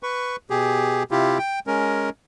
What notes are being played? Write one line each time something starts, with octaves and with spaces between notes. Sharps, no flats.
B4 C#6
B2 G4 G#4
C3 E4 F4 G4
G5
G#3 C#4 A#4